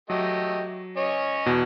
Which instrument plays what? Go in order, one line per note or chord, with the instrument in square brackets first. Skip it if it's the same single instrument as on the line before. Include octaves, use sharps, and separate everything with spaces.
[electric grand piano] F#3 [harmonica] A3 G4 D#5
[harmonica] C#4 C#5 D#5
[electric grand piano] E2 B2 F#4